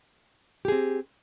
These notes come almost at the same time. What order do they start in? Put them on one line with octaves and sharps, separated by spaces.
G4 G#4 C4